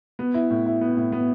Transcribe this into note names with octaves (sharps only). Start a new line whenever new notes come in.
B3
E4
A2
E4
B3
A2
B3